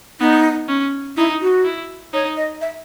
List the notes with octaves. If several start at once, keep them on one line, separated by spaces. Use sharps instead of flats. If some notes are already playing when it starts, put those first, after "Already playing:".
B3 D#4
C#4
D#4 E4
F#4
E4
D#4 C#5
D#5
E5